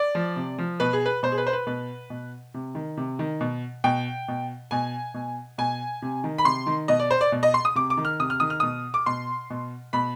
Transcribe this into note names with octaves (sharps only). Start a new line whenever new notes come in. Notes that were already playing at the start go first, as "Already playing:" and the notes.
Already playing: D5
F3
C3
F3
B2 B4
G#4
B4
B2 C5
G#4
B4
C5
B4
B2 B4
B2
C3
D#3
C3
D#3
B2
B2 G5
B2
B2 G#5
B2
B2 G#5
C3
D#3
B5
C3 C6
D#3
B2 D#5
D5
C5
D5
B2
D#5
C6
D#6
C3 D6
D6
D#3
F6
C3 D#6
F6
D#3 D#6
F6
B2 D#6
D6
B2 C6
B2
B2 B5